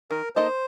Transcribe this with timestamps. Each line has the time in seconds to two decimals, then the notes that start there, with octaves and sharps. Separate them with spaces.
0.11 D#3 A#4
0.36 A#3 D#4 A4 C5 D#5